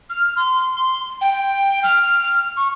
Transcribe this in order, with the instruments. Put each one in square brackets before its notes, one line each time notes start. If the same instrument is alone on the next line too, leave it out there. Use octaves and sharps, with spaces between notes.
[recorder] F6
C6
G5
F6
C#6